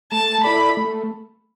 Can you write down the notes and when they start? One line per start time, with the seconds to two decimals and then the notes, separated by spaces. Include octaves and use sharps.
0.12 A3 A5
0.44 E4 A4 D5 B5
0.77 A3